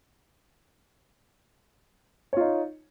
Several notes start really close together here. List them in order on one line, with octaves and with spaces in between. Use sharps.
C#5 F4 D#4